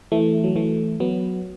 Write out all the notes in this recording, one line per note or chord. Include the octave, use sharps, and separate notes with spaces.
E3 A3
F#3
E3 A3
F#3 B3